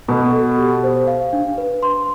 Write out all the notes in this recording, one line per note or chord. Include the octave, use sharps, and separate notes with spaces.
B2 A4
A4
G4
C5
F5
D4
B4
C6